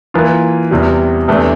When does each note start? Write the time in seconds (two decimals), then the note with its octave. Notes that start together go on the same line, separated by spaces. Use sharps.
0.14 E3 A#3 F4
0.71 E2 C3 G3
1.28 E2 C3 E3 A3 D4